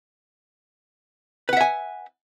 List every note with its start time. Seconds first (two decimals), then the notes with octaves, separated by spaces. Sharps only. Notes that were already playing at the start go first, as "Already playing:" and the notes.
1.49 B4
1.53 F#5
1.57 E5
1.61 G#5